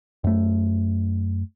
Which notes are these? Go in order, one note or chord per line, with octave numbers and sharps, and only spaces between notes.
F#2 A3